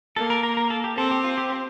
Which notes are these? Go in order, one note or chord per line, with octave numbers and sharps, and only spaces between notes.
A#3 A4
A#4
A#4
A#4
A4
G4
C4 A4
G4
F4
G4